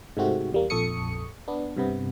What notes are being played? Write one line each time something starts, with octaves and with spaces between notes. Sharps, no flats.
G#2 C3 A3 C4 F#4
E2 G3 A#3
A#1 F2 A4 C#6 D#6 C#7
B3 D4
G2 C3 B3